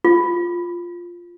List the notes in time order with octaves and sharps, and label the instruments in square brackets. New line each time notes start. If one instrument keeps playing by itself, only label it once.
[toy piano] F4